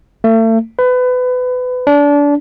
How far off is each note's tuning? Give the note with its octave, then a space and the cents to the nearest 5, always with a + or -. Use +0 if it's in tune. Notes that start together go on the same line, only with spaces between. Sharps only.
A3 +35
B4 +25
D4 -25